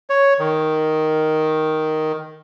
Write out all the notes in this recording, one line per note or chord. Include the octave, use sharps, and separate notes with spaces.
C#5
D#3